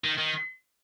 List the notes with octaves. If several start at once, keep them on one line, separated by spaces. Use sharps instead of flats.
D#3
D#3